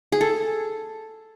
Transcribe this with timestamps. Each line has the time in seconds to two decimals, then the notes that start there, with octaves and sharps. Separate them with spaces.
0.12 G#4
0.21 A4